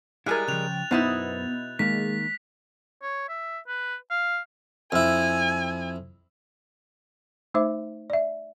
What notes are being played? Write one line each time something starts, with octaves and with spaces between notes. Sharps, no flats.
G3 G#3 E4 G#4 A#4 F#6 A6
C#3 F3 G5 F#6 F7
F#2 B2 B3 D#4 E4 C5 A5
D#3 G#3 A#3 B6
C#5
E5
B4
F5
F2 E4 G#5
A3 D#4 C5 E5 D6
D5 E5